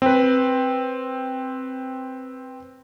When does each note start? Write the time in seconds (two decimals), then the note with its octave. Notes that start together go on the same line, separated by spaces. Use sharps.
0.02 C4 B4